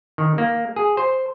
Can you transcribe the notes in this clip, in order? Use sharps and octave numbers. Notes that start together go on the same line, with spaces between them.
D#3
A#3
G#4
C5